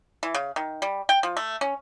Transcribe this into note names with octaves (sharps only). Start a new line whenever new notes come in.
E3
C#3
D#3
G3
G5
F3
A3
C#4